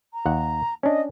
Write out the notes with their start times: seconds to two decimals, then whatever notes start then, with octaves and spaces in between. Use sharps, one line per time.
0.13 A#5
0.26 D#2 F#5
0.83 C#4 D4 D#5